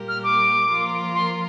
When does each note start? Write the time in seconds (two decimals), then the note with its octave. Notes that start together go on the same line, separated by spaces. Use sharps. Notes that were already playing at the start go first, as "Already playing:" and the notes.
Already playing: A#2 G3 A#3 G4 A#4
0.08 F6
0.23 D6
0.70 F3 A#3 F4 A#4
1.15 C6